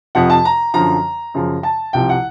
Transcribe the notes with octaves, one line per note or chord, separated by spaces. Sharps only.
F2 C3 F3 F#5
A5
A#5
F#2 D3 F3 A#5
F#2 C#3 F3
A5
C2 C3 F3 G5
F#5